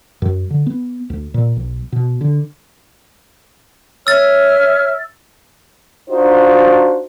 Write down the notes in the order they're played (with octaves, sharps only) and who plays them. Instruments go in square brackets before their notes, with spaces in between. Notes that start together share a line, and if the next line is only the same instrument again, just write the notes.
[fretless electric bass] F#2
D3
B3
D2
A#2
B1
B2
D3
[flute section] C#5 E5 F6 [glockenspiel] E6 A6
[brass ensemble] D4 D#4 F4 F#4 C5